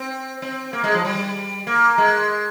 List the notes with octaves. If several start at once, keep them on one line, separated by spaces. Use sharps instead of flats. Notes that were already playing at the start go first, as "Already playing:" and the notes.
Already playing: C4
C4
A#3
G#3
F3
G3
A#3
G#3